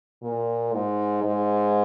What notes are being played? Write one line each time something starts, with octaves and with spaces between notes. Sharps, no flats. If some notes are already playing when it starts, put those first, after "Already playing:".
A#2
G#2
G#2